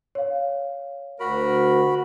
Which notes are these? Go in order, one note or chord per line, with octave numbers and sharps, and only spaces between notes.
C#5 F5
D2 F#4 A#4 B5